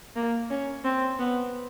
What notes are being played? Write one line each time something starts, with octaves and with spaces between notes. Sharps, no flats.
A#3
C#4
C4
B3